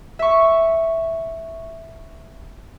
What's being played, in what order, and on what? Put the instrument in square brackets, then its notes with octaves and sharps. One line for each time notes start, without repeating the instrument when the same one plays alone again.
[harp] E5 C#6